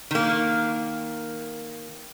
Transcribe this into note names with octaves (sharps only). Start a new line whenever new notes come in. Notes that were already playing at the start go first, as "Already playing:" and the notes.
D#3 A#3